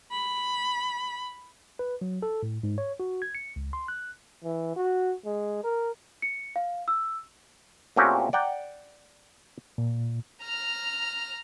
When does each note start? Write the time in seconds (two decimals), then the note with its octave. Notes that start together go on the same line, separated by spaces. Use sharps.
0.11 B5
1.79 B4
2.01 F#3
2.22 A4
2.43 A2
2.63 G#2
2.78 C#5
3.00 F#4
3.22 G#6
3.35 C#7
3.56 C#2
3.73 C6
3.88 F#6
4.44 E3
4.76 F#4
5.25 G#3
5.64 A#4
6.22 C#7
6.56 F5
6.88 E6
7.96 A#2 A3 C4 C#4 F#4 G4
8.33 D5 F#5 G5 A#5
9.78 A#2
10.42 A#5 F6